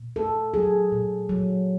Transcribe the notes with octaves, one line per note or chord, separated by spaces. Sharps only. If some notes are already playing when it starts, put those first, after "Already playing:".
Already playing: A#2
A3 A4
F#3 G#4
A#2
F#3